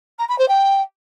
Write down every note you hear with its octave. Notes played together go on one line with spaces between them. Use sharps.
A#5
B5
C5
G5